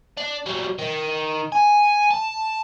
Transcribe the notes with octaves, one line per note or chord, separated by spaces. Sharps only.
D4
F#3 G3
D#3
G#5
A5